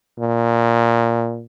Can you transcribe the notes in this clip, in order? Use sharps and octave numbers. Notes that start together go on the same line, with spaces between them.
A#2